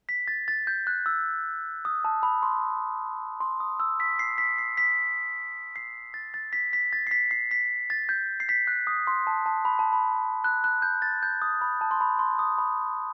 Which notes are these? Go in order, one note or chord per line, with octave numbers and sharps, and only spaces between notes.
B6
A6
A6
G6
F#6
E6
D#6
A5
B5
C6
C6
D#6
E6
B6
C7
B6
C7
B6
C7
A6
A6
B6
B6
A6
C7
B6
C7
B6
A6
G6
C7
B6
F#6
D#6
C6
A5
A5
B5
A5
B5
F#6
F#6
G6
A6
G6
D#6
B5
A5
C6
B5
C6
D#6
B5